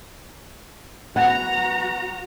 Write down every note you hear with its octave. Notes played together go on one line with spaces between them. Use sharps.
B3 F#4 F#5 A#5